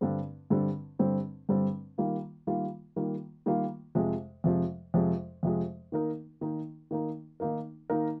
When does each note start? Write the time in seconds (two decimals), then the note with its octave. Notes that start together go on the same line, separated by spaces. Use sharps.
0.01 G2 D3 G3 C4
0.50 G2 D3 G3 C4
0.99 G2 D3 G3 C4
1.49 G2 D3 G3 C4
1.98 D#3 G3 A#3 F4
2.47 D#3 G3 A#3 F4
2.96 D#3 G3 A#3 F4
3.46 D#3 G3 A#3 F4
3.95 F2 C3 F3 G#3
4.44 F2 C3 F3 G#3
4.94 F2 C3 F3 G#3
5.43 F2 C3 F3 G#3
5.92 D#3 A#3 D#4 A#4
6.41 D#3 A#3 D#4 A#4
6.91 D#3 A#3 D#4 A#4
7.40 D#3 A#3 D#4 A#4
7.90 D#3 A#3 D#4 A#4